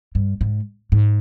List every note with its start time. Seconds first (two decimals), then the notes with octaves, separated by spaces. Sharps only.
0.15 G2
0.41 G#2
0.92 G#2